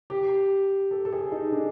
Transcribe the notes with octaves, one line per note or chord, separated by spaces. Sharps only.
G4
A4
A4
G#4
D#4
D4